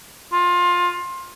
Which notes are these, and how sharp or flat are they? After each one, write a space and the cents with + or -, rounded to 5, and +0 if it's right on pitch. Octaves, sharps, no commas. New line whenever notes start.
F4 +20